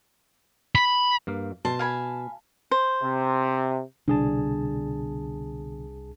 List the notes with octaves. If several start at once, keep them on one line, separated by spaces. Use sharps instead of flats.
B5
G2 A#3 F5
B2 C5 A5
F5 G#5 B5
C5
C3
C2 B2 D3 D4 G#4 A5